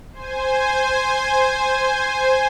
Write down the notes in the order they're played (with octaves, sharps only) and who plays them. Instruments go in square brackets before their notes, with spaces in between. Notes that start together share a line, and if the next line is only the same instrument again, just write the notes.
[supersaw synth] C5 G#5